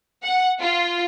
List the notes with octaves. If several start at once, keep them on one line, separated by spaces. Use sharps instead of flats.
F#5
F4